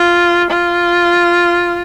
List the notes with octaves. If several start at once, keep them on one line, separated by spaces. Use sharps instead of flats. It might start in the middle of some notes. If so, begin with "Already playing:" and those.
Already playing: F4
F4